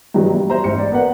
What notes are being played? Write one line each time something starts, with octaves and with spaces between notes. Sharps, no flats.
G2 C3 D#3 E3 F#3 G#3
G2
C5 E5 A#5
A1 G#2 C#7
D5
B3 A#4 B4 F#5